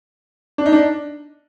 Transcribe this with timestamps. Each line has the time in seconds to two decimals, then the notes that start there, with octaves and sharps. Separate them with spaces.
0.58 D4
0.66 D#4
0.73 D4